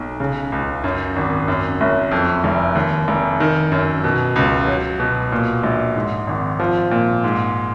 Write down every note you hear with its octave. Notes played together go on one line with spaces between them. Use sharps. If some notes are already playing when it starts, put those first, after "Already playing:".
Already playing: B1
C#3
C#2
F#2
G#1
F#2
F#1
F2
F1
D#2
F1
D#3
F#2
B2
C#2
F#3
B2
A#2
A#1
G#2
G#1
F3
A#2
G#2